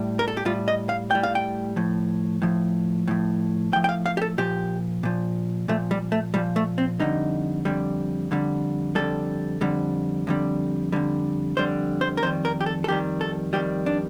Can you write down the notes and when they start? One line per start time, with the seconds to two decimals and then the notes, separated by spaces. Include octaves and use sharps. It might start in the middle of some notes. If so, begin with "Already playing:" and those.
Already playing: A2 G3
0.19 A#4
0.28 A4
0.37 G4
0.45 A2 G3 F4
0.68 D#5
0.89 F5
1.11 A2 G3 G5
1.23 F5
1.35 G5
1.76 A2 F3
2.42 A2 F3
3.08 A2 F3
3.73 A2 G5
3.76 F3
3.84 G5
3.89 F5
4.06 F5
4.17 G4
4.22 A4
4.38 A#2 F3 G4
5.03 A#2 F3
5.68 A#2 F3 A3
5.91 G3
6.12 A3
6.34 A#2 F3 G3
6.56 A3
6.78 C4
7.00 F2 D3 G3 D#4
7.65 F2 D3 G3
8.31 F2 D3 G3
8.95 F2 D3 G3 A4
9.61 F2 D3 G3
10.27 F2 D3 G3
10.92 F2 D3 G3
11.57 F2 D3 G3 C5
12.01 C5
12.17 A#4
12.23 F2 D#3 G3 C5
12.45 A#4
12.61 G4
12.66 A4
12.84 A4
12.88 F2 D#3 G3 G4
13.21 A4
13.53 F2 D#3 G3 G4
13.86 D4